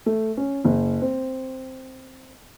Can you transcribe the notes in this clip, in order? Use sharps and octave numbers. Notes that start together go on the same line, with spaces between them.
A3
C#4
F#1
C4